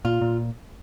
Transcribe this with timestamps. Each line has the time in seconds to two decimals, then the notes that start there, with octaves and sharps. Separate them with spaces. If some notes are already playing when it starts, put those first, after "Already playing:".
0.05 A#2 F4
0.21 A#2